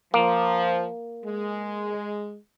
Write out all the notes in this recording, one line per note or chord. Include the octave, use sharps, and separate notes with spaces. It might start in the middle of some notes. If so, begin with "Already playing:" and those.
F3 A#3
G#3